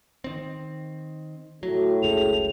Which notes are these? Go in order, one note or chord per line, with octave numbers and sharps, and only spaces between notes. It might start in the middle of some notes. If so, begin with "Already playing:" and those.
D#3 C4
A2 F#3 F#4
F#1 C#2 F#2 G#4 F7